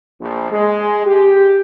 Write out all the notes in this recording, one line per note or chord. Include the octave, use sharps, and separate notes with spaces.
A#1
G#3
G4